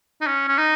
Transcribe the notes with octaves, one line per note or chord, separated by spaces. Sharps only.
D#4
C#4
C#4
D#4